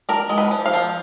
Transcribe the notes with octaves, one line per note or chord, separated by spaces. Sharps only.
D4 A#4
G#3
B4
F3
F5
F3